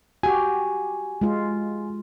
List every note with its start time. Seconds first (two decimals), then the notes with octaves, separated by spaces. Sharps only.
0.23 F#4 G4 G#5
1.21 G#3 F4